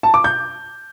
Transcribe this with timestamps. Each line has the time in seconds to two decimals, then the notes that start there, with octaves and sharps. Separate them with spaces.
0.03 A5
0.14 D6
0.24 G6